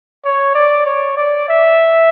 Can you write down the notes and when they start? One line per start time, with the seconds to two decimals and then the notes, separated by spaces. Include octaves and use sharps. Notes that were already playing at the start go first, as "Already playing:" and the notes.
0.25 C#5
0.55 D5
0.86 C#5
1.17 D5
1.49 E5